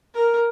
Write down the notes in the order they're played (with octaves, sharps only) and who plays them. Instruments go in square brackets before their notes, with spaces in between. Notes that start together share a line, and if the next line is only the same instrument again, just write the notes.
[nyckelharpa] A#4